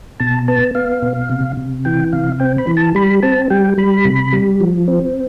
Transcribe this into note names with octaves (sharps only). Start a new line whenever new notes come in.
B2 A5
B3 A5
B3 F5
B2
C3
C3
E3 G5
C3 F5
C4 G5
B5
E3
A5
G3 B5
C4 A5
G3 G5
G3 B5
C3
G3
F3
C4